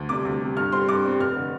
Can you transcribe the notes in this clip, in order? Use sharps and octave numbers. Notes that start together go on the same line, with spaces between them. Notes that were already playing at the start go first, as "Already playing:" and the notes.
Already playing: D2
C3 G3 D6
D2
C3 G3
G2 F6
G3 C4 C6
G2 D6
G3 C4
F1 F6
D3